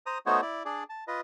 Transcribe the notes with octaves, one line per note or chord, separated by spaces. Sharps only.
C5 A#5 D#6
A3 B3 D#4 F#4 C5 C#5
E4 D5
D4 G#4 D5
A5
F4 B4 D#5